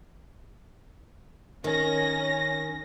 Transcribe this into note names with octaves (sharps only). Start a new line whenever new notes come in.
D#3 C#4 A#6